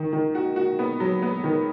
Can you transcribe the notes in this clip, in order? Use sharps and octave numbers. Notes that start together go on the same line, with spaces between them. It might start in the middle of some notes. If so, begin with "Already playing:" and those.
Already playing: D#3
D#3
F#4
F#4
B3
F#3
B3
D#3